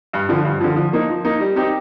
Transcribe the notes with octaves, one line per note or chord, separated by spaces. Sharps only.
G2
D3 F3
G2
D3 F3
F3
A#3 D#4
F3
A#3 D#4
G3
C4 D#4 G4